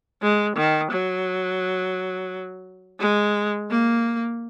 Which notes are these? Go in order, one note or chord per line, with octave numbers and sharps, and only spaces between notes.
G#3
D#3
F#3
G#3
A#3